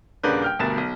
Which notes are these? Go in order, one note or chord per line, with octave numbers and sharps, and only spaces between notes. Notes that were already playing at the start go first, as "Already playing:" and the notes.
D#1 C#3 D4 A#4 B4 G6
G5 F6 G6
D2 G2 B2 A#4 A6 E7
B1